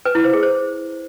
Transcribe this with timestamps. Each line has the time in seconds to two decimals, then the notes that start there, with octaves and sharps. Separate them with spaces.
0.05 B4
0.15 E4
0.24 C5
0.33 G#4
0.43 C5